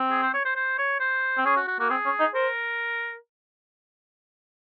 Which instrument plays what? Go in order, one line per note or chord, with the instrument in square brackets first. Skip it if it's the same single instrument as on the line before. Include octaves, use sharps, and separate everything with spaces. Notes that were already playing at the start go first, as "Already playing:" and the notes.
Already playing: [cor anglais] C4
[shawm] G#4
C5
C#5
C5
C5
C#5
C5
[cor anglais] C4
[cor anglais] C#4 [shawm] G#4
[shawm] F#4
F#4
[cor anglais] A#3 [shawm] F#4
[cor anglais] C4 [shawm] G#4
[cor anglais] C#4
D#4
[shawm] A#4 [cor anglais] C5